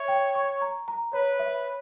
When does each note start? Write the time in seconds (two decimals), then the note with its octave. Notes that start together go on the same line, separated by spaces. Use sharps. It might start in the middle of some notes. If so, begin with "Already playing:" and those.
Already playing: C#5 E5
0.08 G5
0.35 C#6
0.62 A#5
0.88 A#5
1.13 B4 C#5
1.39 E5